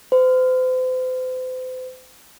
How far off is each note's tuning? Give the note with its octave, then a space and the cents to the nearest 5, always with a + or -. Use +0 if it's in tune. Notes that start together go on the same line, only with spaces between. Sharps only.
C5 -40